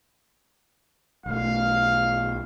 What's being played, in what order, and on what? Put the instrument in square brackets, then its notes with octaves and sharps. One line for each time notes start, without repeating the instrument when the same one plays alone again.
[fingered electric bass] B1 A3 [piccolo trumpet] F5